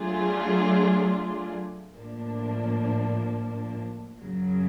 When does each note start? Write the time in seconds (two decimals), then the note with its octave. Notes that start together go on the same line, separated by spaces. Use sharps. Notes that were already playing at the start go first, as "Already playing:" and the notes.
Already playing: F#3 A3 D4 F4 G#4
1.94 A2 F3 A#3 D4
4.21 F#2 C#3 F#3